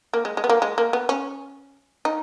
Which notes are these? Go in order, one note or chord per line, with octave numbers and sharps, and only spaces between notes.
A#3
G#3
G#3
B3
A#3
G#3
A#3
B3
C#4
D#4